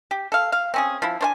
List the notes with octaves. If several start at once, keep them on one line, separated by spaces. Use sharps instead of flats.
G4
A4 F5
F5
C4 C#4 G#4
F3 E4
D4 C5 G#5